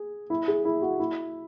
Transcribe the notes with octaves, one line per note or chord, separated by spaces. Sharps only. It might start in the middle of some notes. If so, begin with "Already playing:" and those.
Already playing: G#4
E4
G#4
E4
F#4
E4